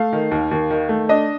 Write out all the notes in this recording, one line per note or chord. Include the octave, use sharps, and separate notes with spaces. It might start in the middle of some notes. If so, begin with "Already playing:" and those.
Already playing: A3 F5
D#3
D#2
D#2
D#3
A3
D4 D#5